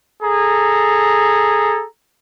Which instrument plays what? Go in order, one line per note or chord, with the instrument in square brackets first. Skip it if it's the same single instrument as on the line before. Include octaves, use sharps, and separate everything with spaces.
[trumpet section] G#4 A4 A#5